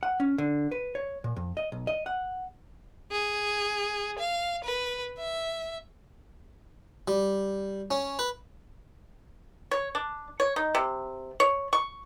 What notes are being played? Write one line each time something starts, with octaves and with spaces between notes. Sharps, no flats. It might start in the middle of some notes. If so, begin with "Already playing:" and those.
F#5
C#4
D3
B4
C#5
A#2
F2
D#5
B1
D#5
F#5
G#4
F5
B4
E5
G3
C#4
B4
C#5
D4
C#5
D#4
C3
C#5
C#6